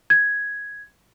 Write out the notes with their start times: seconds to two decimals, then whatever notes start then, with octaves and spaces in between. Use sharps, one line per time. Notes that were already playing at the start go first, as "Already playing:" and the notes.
0.10 G#6